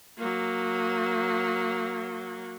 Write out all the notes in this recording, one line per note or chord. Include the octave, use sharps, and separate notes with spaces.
F#3 A#3